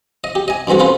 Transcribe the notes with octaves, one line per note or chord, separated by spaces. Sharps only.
D#5
G4
D#5 G#5
G2 E3 C4 F#4 A4
C#4 F4 A4 B4 C5